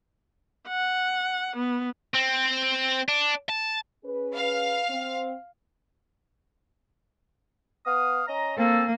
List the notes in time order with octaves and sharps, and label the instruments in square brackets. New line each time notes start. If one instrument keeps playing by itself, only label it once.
[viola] F#5
B3
[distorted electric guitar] C4
D4
A5
[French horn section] C#4 G#4 B4
[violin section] F5
[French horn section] C4
[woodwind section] B3 F5 D#6
C#4 D#5 A#5
[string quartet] A#3 [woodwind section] C4 A4